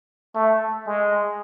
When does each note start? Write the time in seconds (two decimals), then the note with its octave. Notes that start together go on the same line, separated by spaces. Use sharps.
0.35 A3
0.87 G#3